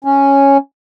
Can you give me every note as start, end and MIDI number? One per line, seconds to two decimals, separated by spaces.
0.05 0.57 61